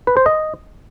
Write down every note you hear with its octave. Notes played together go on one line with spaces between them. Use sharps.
B4
C5
D#5